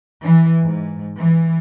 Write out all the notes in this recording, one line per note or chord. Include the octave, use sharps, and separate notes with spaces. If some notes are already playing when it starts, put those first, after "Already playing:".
E3
G#2
E3